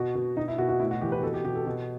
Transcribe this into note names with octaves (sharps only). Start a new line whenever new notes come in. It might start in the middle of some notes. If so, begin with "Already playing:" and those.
Already playing: B2 F#4
B2
B2 D#4
E4
B2 F#4
F#4
A2 E4
F#4
E3 G4
B4
B2 A4
G4
B2 G4
A4
B2